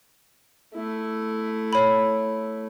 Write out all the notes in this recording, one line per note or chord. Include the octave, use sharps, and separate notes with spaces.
A3 E4
C#5 B5